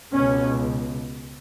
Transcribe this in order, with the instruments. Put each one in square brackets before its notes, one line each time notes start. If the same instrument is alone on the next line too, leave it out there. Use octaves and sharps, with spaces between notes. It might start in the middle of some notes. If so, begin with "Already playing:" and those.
[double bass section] C#2 B2 C#4